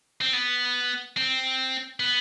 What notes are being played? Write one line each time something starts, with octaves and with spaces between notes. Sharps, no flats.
C4
B3
C4
B3